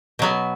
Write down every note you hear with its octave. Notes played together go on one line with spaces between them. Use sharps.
B2 F#3 B3